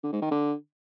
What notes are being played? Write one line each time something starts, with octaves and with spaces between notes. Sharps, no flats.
D3
G#2
D#3
D3